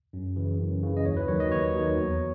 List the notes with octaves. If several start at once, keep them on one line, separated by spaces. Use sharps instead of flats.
F#2
C#3 E3
F#2
C#3 E3
D#5
D#2 C#5
B4
D#3 F#3 C#5
D#5
D#2 C#5
D#3 F#3
E2